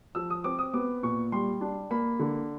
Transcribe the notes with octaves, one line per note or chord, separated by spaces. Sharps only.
F3 E6
D#6
C4 D6
D#6
B3 D6
A#2 C#6
G3 C6
D4
A#3 B5
D3